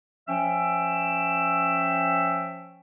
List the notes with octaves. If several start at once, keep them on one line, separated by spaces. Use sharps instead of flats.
F3 C#4 E5 G5 E6